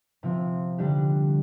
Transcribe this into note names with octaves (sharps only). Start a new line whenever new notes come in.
C3 F3 C4
D3 G3 D4 G4